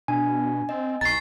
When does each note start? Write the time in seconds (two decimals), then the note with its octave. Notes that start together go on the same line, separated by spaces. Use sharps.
0.08 B2 D4 G#5
0.69 C4 D#5
1.01 B1 A#5 C#6 A6 C7